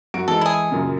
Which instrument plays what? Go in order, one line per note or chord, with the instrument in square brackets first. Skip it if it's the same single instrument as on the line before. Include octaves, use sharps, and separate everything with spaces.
[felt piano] F#2 F#4 D7
[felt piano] E3 G#3 [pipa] A4
[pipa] E4 G#4
[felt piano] F#2 A#2 C#3